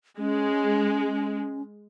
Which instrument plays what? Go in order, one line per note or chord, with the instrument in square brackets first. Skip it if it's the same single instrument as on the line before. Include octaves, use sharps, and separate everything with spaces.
[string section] G#3 [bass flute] C#4